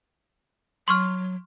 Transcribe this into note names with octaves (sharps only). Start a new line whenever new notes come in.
F#3 C6 C#6 F6